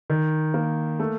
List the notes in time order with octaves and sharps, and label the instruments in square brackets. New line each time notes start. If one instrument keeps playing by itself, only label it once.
[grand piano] D#3
A#3
A3